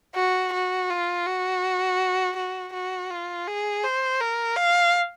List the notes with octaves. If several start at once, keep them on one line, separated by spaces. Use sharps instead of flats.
F#4
F#4
F4
F#4
F#4
F#4
F4
G#4
C5
A#4
F5